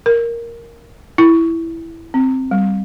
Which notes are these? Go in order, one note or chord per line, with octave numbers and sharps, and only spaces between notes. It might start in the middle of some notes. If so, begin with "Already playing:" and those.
A#4
E4
C4
G3